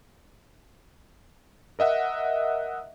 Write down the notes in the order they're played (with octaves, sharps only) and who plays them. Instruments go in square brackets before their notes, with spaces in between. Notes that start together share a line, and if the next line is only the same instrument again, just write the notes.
[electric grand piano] A#4 D#5 E5 F#5